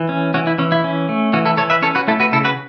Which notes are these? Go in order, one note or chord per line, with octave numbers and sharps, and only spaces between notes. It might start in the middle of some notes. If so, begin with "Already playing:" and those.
Already playing: E3
C#4
E3 C#4 F#4
E4
E3 C#4
E4
C#4
A3
E3 C#4 F#4
E4 A4
E3 A4 C#5
B4 E5
C#4 A4 C#5
F#4 B4
A3 E4 A4
F#4 B4
C#3 E4 A4
F#4 B4